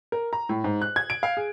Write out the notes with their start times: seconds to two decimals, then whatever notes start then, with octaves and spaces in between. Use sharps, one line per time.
0.12 A#4
0.33 A#5
0.49 A2
0.64 G#2
0.81 F#6
0.96 G#6
1.10 D7
1.23 F5
1.37 G#4